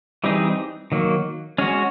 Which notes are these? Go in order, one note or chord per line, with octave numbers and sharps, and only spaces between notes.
E3 G3 C4 D#4 G#4
D#3 F#3 A#3
G#3 C#4 F#4